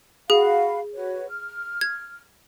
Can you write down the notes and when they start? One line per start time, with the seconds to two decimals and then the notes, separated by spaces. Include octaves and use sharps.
0.30 F#4 G#4 F5 B5
0.94 F#4 B4 C#5
1.28 F6
1.81 G#6